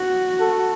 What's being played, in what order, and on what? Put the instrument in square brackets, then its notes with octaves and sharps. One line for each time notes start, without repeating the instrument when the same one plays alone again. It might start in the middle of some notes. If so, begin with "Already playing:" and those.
Already playing: [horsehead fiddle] F#4
[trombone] A4